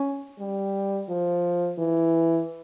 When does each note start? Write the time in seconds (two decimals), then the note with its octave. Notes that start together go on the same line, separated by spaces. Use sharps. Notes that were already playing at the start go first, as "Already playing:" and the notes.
Already playing: C#4
0.39 G3
1.09 F3
1.78 E3